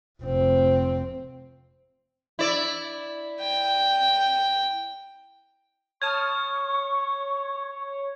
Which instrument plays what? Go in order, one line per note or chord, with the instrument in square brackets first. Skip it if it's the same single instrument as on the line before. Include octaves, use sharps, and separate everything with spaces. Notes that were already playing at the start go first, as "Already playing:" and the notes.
[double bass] F1 C4
[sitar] E4 D5
[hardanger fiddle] G5
[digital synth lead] C#5 [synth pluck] A5 D#6 F6 [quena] C#6 [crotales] G#6